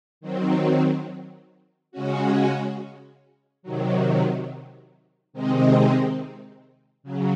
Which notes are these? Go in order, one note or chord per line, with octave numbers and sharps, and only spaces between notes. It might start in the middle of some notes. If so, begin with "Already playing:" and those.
D#3 F#3 C4
C#3 G#3 C#4 F#4
C3 D#3 F#3
C3 D#3 G#3 C4 D#4
C#3 F#3